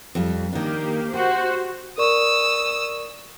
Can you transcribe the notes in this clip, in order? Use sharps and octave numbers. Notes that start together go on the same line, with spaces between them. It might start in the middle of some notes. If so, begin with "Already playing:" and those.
F2 G3
D#3 A#3 D4 G4
F#4 G4 C5
A#4 D5 C#6 D#6 E6